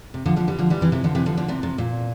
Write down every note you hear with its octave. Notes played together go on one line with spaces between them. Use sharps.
C3
D3 F3
D3 F3
E3 G3
D3 F3
E3 G3
C3 E3
C3 E3
D3 F3
C3 E3
D3 F3
D3 F3
C3 E3
C3
A#2